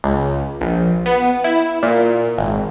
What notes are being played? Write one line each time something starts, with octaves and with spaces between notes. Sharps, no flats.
C#2
A#1
B3
E4
A#2
G#1